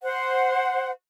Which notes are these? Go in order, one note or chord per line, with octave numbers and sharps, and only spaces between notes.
C5 F#5